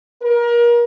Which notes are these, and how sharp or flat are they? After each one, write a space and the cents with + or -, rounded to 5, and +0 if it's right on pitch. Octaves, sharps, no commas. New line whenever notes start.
A#4 +30